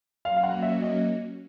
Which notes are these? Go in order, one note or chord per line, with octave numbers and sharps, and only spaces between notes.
F#3 A#3 C#4 F#4 F5
F5
F#5
E5
D#5